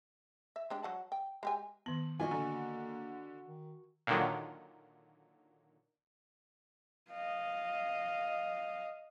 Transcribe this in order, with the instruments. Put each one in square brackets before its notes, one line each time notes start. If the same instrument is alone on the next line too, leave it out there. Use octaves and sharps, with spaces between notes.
[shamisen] E5
G#3 D4 G4
F#3 F#5 A5
G5
G#3 G4 G#5
[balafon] D#3 B3 [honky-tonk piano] F#7
[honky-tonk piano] A#2 F3 [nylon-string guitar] F#4 D#5 G#5
[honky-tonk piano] D3 [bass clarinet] A#3 [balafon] A#5
[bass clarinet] D#3
[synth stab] A#2 D3 D#3 F#3
[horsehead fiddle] D#5 F5